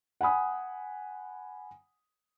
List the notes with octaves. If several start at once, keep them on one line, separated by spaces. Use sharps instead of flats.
F#5 G#5 B5 D#6